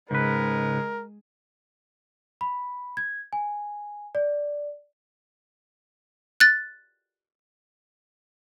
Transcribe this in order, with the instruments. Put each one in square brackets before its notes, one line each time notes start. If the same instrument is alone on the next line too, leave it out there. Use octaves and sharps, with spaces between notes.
[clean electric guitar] G#2 B4 [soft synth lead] C#3 [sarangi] G#3 [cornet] A#4
[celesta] B5
G#6
G#5
D5
[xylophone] F#6 A6